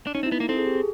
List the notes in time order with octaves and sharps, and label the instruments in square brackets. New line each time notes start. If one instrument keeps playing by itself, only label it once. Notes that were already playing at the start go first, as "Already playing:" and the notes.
[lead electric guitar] D4
[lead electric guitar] C#4 [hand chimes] D#4
[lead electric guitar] C4
[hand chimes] E4
[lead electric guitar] B3
A#3
[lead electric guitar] C4 [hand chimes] A4
[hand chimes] G#4
G4
G#4